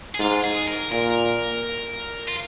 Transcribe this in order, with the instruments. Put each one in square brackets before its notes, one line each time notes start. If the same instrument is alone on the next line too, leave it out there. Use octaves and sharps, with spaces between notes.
[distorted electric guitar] G#4
[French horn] G#2 [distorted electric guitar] F4
[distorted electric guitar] G#4
A#4
[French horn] A#2 [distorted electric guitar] A#4
[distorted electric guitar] F4